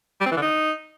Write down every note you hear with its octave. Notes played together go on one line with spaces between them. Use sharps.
G3
C4
E3
D3
D#4